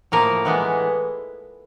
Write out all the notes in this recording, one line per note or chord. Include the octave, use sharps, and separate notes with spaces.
A2 F3 A#3 A#4
A2 E3 G#3 B3